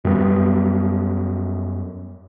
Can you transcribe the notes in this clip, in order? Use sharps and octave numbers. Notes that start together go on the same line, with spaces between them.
F#2 G3 G#3 B3